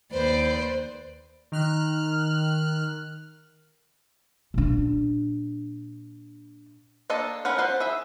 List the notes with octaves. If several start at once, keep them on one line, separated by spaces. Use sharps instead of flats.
D#2 B4 C5 D5
D#3 F6 F#6
A#2 D4
A#3 D4 A4 D#5 A5
C#4 A#4 B4 F#5
F#3 B3 B4 C5 F#5
G#4 E5 B5